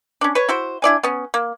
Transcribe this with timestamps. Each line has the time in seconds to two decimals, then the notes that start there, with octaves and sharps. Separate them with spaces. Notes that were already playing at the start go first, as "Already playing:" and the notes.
0.21 C#4 D4
0.35 B4 C#5
0.49 E4 F#4 C5
0.82 D4 E4 D5 G#5
1.03 B3 C#4
1.34 A#3